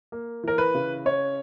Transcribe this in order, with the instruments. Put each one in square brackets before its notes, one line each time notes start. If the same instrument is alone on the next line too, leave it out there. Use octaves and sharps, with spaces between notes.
[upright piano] A#3
E3 A#4
B4
C#3
C#4 C#5